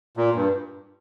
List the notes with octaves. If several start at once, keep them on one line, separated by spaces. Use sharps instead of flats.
A#2
G2